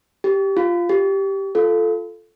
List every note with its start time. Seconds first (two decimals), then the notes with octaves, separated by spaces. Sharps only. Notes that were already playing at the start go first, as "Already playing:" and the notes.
0.24 G4
0.57 F4
0.89 G4
1.55 F4 A4